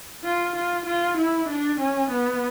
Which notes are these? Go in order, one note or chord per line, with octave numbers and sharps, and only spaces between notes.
F4
F4
F4
E4
D4
C#4
B3